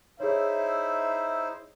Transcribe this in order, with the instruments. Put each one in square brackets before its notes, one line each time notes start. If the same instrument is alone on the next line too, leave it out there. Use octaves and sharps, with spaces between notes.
[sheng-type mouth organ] D#4 E4 C5 [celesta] G#4 C#5 [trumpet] E5